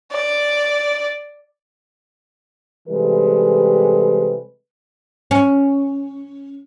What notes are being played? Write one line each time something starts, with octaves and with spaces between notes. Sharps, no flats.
D5
C3 E3 G3 G#3 A4 B4
C#4